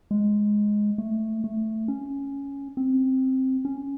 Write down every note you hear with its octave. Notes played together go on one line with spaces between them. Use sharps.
G#3
A3
A3
C#4
C4
C#4